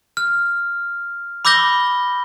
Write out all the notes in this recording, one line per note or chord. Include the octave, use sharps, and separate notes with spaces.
F6
B5 D6 E6 G6 A#6 G7